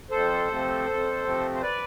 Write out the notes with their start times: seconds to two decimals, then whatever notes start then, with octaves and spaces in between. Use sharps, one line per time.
0.11 F2 A4 C5
0.48 C3 F3 A3 C4
0.87 F2
1.25 C3 F3 A3 C4
1.54 C5
1.62 B4 D5